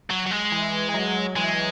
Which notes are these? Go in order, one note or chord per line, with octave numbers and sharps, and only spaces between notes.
F#3
F#3
G#3
E3
E3
F#3
E3 G#3